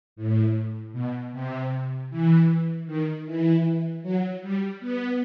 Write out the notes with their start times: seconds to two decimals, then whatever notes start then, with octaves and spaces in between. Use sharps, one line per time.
0.16 A2
0.93 B2
1.32 C3
2.10 E3
2.87 D#3
3.26 E3
4.03 F#3
4.42 G3
4.80 B3